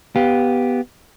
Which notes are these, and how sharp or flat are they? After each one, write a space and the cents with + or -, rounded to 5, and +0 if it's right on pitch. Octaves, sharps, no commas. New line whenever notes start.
B3 +0 G4 +5 F5 +20